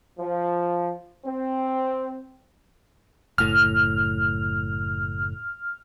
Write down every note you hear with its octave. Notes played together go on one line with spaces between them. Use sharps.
F3
C4
F#1 A2 F6